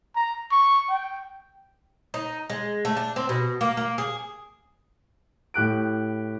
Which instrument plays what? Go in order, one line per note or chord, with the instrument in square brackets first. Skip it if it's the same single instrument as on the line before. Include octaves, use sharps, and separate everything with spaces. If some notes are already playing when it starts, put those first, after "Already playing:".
[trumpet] A#5
C#6
G5
[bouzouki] D#4
G#3
A3
D4
C4
B2
A#3
A#3
G#4
[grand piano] A2 G4 F#6 D7